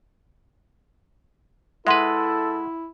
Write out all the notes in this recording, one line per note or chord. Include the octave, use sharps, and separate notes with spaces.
G#3 E4 A4 B4 E5 F#5 C6